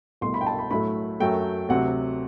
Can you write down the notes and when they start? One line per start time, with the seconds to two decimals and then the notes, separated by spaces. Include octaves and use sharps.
0.21 C2 B2 A3 C6
0.34 B5
0.41 G5
0.47 A5
0.59 B5
0.71 A2 F#3 A3 B5
1.20 F#2 F#3 A3 G5
1.69 D2 C3 F#3 F#5